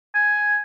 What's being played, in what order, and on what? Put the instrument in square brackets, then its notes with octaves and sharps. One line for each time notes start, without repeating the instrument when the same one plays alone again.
[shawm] G#5